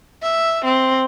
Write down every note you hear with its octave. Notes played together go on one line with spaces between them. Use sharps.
E5
C4